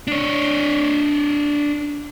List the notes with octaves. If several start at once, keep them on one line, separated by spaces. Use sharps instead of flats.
D4 C#5